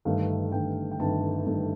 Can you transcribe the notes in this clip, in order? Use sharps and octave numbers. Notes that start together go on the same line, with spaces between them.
G1 G2 D#3 A3 F5
G1 G2 D#3 A3 G5
G5
G1 G2 D#3 A3 A5
G1 G2 D#3 A3